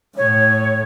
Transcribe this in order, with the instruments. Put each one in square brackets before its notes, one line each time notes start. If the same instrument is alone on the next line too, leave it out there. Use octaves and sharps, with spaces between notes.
[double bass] A2 [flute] C#5